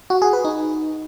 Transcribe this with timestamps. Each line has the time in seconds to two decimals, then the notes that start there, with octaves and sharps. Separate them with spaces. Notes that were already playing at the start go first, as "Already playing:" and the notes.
0.10 F#4
0.22 G#4
0.33 B4
0.45 D#4